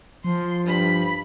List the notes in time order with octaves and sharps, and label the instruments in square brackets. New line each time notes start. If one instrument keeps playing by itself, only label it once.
[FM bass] F3 [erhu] C6
[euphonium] G2 [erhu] B5